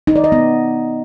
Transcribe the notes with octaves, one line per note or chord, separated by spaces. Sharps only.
D#4
D5
D#5
B3